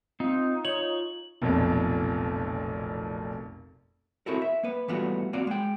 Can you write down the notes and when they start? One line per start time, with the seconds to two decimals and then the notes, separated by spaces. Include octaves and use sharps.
0.20 C4 D#4 F4
0.65 F4 C#5 F#7
1.42 F1 B1 F2 A#2
4.26 C4 E4 F#4 A4 A#4
4.42 E5
4.63 A#3 B4
4.88 E3 G3 A3 B3 F4 F#4
5.33 A#3 C4 F4 F#4 D5
5.47 G#3 G5